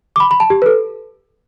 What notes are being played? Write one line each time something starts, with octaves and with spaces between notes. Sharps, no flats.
D6
B5
B5
A5
G4
B4
A4